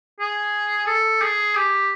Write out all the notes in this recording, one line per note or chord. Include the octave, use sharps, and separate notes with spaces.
G#4
A4
G#4
G4